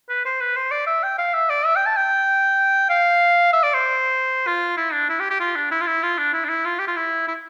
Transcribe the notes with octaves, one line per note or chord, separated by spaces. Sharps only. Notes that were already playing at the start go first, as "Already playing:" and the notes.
B4
C5
B4
C5
D5
E5
G5
F5
E5
D5
E5
G5
A5
G5
F5
E5
D5
C5
F4
E4
D4
E4
G4
G4
F4
D4
E4
F4
E4
F4
D4
E4
D4
E4
F4
G4
F4
E4
E4